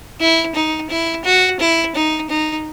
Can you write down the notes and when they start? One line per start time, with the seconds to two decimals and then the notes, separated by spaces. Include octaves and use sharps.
0.20 E4
0.55 D#4
0.90 E4
1.25 F#4
1.60 E4
1.95 D#4
2.30 D#4